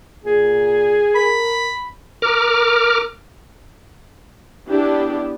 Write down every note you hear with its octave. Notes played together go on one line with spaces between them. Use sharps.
A#2 G#4
A#4 B5
A#4 D6 F6
B3 D4 E4 G4